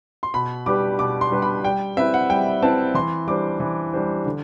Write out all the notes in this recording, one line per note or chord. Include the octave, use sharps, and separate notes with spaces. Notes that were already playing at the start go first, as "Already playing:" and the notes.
C6
B2 B5
G3 D4 G4 B4 D6
B2 D6
C6
G3 D4 G4 B4
B5
G3 G5
C4 E4 B4 E5
F#5
G3 G5
C4 E4 B4 A5
E3 C6
G3 D4 G4 C5 D6
E3
G3 D4 G4 C5
D3